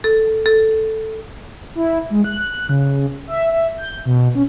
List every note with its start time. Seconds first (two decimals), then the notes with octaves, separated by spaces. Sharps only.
0.04 A4
0.46 A4
1.75 E4
2.10 G#3
2.24 F#6
2.69 C#3
3.27 E5
3.52 E5
3.77 G6
4.06 B2
4.35 C#4